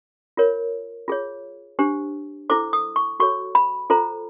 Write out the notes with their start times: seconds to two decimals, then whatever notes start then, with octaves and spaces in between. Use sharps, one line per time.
0.37 F4 A#4 C#5
1.08 F4 G#4 C#5
1.79 D4 G4 C5
2.50 E4 A4 C5 D6
2.73 D#6
2.96 C#6
3.20 F#4 A4 C#5 C#6
3.55 B5
3.90 F4 A4 C5 A#5